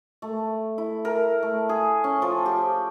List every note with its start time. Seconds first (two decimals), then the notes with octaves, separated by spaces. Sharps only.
0.22 A3
0.78 E4
1.05 A#4
1.43 A3
1.69 G#4
2.04 C#4
2.22 F3
2.46 G4